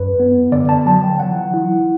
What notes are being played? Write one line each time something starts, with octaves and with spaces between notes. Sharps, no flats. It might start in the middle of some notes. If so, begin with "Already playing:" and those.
Already playing: F#2 B4
B3
D3 D5
A5
F#3 A5
G5
E3 F#5
E4